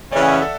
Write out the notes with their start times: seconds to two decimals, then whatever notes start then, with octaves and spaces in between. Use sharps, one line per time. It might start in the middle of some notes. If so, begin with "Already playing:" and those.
0.12 C#3 E3 A3 C#4 D5
0.22 F#5
0.32 E5
0.42 A4